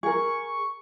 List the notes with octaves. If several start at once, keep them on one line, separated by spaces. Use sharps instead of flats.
G#4 A#4 C#6